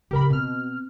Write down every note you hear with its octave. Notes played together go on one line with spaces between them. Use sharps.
C#3 F3 G4 A#4 B5
B2 C4 F6